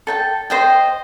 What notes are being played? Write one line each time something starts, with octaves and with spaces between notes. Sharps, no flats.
A4 G5 A5
C5 D#5 G5